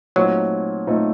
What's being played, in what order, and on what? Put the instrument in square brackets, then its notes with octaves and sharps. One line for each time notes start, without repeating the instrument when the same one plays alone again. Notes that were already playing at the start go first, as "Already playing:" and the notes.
[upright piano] A#2 A3 C4 D#4 [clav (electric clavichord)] F#3
[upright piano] A#2 A3 C4 D#4